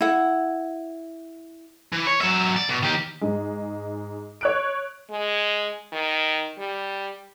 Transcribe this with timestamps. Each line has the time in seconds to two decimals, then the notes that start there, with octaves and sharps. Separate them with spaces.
0.01 E4 F#5
1.93 E3
2.07 C#5
2.21 F#3 E5
2.57 D5
2.69 B2
2.83 D#3 G4
3.21 G#2 G#3
4.41 C#5 F#6 D7
5.10 G#3
5.92 D#3
6.58 G3